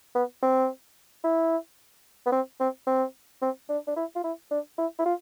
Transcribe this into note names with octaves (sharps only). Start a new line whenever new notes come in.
B3
C4
E4
B3
C4
C4
C4
C4
D4
D4
E4
F4
E4
D4
E4
E4
F4